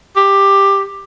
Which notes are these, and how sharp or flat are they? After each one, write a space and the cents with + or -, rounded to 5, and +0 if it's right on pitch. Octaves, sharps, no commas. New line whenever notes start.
G4 +10